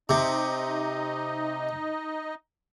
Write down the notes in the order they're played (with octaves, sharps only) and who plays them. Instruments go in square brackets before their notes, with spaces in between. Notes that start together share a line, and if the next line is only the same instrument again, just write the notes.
[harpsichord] C3 [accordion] D#4 D#5